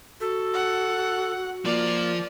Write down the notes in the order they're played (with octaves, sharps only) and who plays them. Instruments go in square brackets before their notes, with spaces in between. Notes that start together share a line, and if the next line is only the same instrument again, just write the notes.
[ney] F#4 [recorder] A4
[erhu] F#5
[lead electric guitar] F3 F4 [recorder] A#3 [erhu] D5